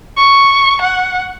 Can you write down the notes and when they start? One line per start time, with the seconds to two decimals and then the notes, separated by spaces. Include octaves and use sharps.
0.17 C#6
0.81 F#5